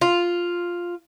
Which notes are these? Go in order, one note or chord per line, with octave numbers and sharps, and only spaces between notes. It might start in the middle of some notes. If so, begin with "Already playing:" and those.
F4